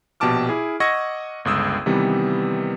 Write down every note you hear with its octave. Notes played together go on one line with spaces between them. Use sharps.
A#1 B2 G4 A5 D6 F6
E4 G#4
D#5 F#5 C#6 E6 G#6 A#6
G1 C#2 D#6 E6
C3 D#3 E3 G3 B3